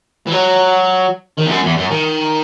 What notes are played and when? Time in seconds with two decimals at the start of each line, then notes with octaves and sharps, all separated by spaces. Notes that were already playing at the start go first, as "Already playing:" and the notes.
0.27 E3
0.32 F#3
1.37 D#3
1.46 E2
1.51 F#2
1.64 E2
1.77 F#2
1.91 D#3